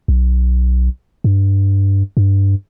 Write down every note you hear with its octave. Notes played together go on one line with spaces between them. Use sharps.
B1
G2
G2